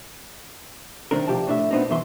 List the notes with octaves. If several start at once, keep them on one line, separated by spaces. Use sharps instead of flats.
C3 D#3 C4 D4 A#4
C3 F3 G4 D5 A5
A2 D4 E5
A#2 B3 C4 D4 D#4
F#2 B2 E3 E5 C6